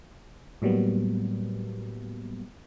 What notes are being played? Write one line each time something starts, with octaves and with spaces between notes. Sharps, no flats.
A2 F#3 G3 A#3 B3